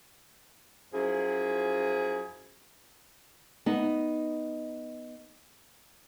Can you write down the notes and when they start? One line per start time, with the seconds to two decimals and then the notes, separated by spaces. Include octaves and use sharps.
0.93 F#2 F3 E4 G#4
3.66 B3 D#4